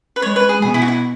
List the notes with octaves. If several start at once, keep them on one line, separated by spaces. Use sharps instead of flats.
B4
G#3 C#5
B4
G#4
B2 G#4
E4
F#4
E4